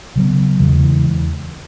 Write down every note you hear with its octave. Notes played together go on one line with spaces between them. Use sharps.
C#3 F#3 B3
E2 C#3 E3 G#3